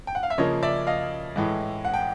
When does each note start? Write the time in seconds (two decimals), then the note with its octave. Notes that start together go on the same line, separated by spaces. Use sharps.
0.07 G5
0.15 F#5
0.23 F5
0.30 E5
0.38 C#3 F3 A#3 C#5 D#5
0.62 D5 E5
0.87 D#5 F5
1.36 A2 E3 G#3
1.85 F#5
1.94 G5